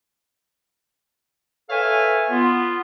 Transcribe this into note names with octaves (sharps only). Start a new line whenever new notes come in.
A4 B4 C#5 E5 F5 G#5
B3 F4